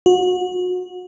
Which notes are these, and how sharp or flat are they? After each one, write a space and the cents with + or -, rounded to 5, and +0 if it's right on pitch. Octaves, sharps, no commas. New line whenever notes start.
F#4 -30